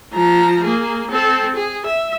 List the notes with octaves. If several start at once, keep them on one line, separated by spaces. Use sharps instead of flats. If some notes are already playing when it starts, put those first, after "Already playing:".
F3 A#5
A#3 G#4
C4 A4
G#4
E5